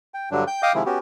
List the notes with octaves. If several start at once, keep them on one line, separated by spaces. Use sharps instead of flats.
G5
G2 D3 F#3 D4
G5 G6
D#5 F5 G5 D6 D#6
C3 D#3 F3 G#3 E4
B3 C#4 F#4 G4